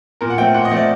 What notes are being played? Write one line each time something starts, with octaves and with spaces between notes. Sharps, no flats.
A#2 A#4
F#5
A3 C4 G5
A#2 F#5
D#5
A3 C4 D5